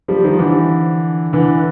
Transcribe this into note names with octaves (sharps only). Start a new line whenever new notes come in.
F3 G3
D#3 F3
D3 E3
D3 E3